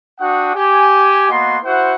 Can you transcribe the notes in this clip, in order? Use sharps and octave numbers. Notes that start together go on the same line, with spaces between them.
D4 F#4 F#5 G5 D#6
G4 G#5
A#3 B3 F#4 D#5 C6
E4 F#4 C5 F#5